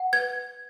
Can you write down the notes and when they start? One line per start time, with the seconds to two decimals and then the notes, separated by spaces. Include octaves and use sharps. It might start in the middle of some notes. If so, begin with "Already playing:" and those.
Already playing: F#5
0.13 B4 G#6